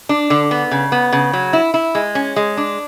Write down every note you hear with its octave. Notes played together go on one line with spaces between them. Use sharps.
D4
D3
B3
C#3
B3
C#3
F#3
E4
E4
G#3
C#4
G#3
D4